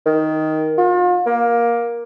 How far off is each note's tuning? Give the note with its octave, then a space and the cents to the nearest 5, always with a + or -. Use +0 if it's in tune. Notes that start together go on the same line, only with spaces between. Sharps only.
D#3 +5
F4 +40
A#3 +15